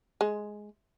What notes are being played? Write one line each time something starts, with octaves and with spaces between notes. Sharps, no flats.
G#3